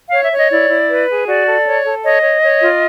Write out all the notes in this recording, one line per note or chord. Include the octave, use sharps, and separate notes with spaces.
C#5 F5
E5
C#5
D#5
E4 D5
E4
B4
G#4
F#4 D5
A4
C#5
A4
C#5 D#5
C#5
C#5
F4